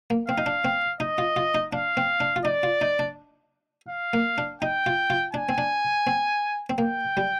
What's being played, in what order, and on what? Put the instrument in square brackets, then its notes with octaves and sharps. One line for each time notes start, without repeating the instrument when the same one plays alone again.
[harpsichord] A#3
[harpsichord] C4 [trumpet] F5
[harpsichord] D#4
D4
C4
[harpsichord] D#4 [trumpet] D#5
[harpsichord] F4
F4
D#4
[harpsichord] D4 [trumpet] F5
[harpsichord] C4
D4
F4
[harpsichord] D#4 [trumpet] D5
[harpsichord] F4
D#4
D4
[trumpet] F5
[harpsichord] A#3
D4
[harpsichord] D#4 [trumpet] G5
[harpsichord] F4
F4
[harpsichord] D4 [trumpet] G#5
[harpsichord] C4
D4
C4
C4
[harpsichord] A#3 [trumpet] G5
[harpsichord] G3